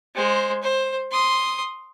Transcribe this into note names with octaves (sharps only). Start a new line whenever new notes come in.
G#3 C5
C5
C6 D#6